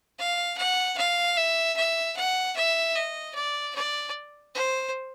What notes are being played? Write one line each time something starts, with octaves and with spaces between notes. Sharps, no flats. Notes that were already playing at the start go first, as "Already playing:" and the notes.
F5
F#5
F5
E5
E5
F#5
E5
D#5
D5
D5
C5